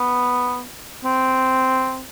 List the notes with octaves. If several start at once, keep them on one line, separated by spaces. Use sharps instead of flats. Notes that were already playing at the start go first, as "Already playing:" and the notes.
Already playing: B3
C4